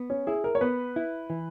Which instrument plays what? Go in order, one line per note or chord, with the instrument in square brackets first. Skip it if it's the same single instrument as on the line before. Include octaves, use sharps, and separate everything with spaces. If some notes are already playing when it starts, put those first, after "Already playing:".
Already playing: [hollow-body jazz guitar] B3
[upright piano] C#4
[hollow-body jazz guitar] E4 [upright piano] G#4
[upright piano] A#4
C#5
[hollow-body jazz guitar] B3 [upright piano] B4
[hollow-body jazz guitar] E4
E3